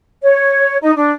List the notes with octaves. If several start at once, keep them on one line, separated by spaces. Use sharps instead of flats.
C#5
D#4
D4